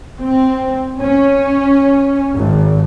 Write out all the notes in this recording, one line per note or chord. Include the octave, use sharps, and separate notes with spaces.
C4
C#4
G#1